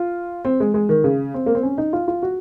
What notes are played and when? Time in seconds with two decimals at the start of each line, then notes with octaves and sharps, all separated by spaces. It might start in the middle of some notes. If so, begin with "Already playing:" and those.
Already playing: F4
0.45 C4
0.60 G#3
0.74 G#3
0.89 D#3
1.04 C#3
1.34 C4
1.46 A#3
1.55 C4
1.63 C#4
1.78 D#4
1.93 F4
2.08 F4
2.22 F#4